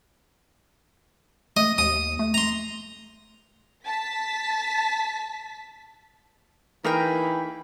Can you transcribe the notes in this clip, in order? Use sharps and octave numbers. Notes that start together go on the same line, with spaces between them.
A3 D#5
D#2 D#6
A3
A#5 C6
A5 B6
E3 A#3 D#4 G#4 A#4 G5 B5